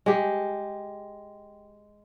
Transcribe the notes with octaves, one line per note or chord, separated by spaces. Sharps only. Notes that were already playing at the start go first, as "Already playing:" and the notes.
G#3 G4